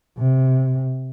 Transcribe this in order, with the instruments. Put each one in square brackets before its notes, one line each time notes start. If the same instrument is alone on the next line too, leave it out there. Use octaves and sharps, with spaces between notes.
[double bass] C3